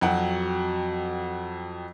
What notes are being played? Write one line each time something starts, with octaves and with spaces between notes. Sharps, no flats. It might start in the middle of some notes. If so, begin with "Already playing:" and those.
F2 F#3 F#4 F#5 G5